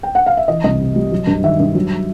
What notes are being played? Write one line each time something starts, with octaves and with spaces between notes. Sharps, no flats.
G5
F#5
F5
E5
E3 D#5
C2 D#5
C3
G3
F#3
G2
D#3 E5
G2
F#3